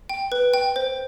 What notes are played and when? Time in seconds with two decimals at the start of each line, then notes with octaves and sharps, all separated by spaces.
0.09 G5
0.32 B4
0.54 G5
0.76 C5